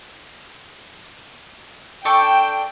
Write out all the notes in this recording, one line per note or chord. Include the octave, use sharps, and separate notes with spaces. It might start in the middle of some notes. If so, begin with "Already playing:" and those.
D4 A4 G5 C#6